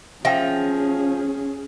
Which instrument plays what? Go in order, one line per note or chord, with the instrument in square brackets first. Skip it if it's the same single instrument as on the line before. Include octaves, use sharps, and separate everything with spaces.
[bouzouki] F3 [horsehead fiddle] C#4 G#4 [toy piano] E5 G5